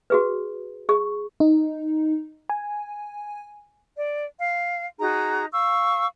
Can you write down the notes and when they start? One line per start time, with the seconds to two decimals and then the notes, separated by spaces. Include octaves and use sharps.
0.10 F#4 G#4 B4
0.89 G#4 C#6
1.40 D#4
2.50 G#5
3.97 D5
4.39 F5
4.99 D#4 F#4 G#4 A#5
5.52 F5 C#6 E6